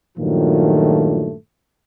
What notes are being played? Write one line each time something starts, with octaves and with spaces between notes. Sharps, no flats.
G2 A#2 D#3 F3 F#3 A3